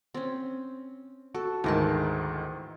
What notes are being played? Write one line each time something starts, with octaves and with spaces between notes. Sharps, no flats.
C4 C#4
F#4 A4
D2 G#2 D#3 E3 A#4 A5